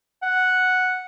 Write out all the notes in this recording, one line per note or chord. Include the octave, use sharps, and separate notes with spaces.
F#5